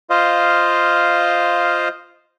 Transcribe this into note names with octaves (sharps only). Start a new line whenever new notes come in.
F4 C5 D#5 F5